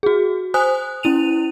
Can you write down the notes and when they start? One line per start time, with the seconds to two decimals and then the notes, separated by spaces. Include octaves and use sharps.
0.03 F#4 G#4
0.54 C5 G#5 D#6 F#6
1.03 C#4 E4 D#7 F7